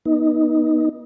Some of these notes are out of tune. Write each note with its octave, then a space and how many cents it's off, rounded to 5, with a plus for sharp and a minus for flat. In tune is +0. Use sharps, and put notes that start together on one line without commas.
B3 -30 D#4 +0